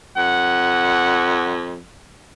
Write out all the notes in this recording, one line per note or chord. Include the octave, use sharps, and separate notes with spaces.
F2 F#5